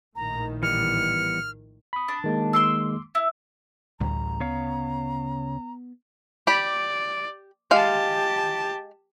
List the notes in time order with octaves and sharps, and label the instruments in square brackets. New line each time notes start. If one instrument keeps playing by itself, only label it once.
[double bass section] A#1 A2 D#3 [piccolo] A#5
[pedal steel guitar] E3 G3 B3 [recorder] F6 [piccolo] C#7
[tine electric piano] B5 D#6
[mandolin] D4
[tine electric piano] D#3 G#3 A#3
[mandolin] C6 D6 E6
E4
[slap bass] A1 A2 G3 [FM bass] D2 [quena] A#5
[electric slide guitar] C#3 C#5 F5 [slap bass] B3
[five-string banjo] G4 B5 [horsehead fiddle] D5
[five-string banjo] G#3 F5 [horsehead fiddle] G4 A5